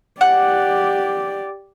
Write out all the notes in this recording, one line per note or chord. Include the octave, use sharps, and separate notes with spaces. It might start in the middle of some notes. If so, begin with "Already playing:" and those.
G4 D5 F#5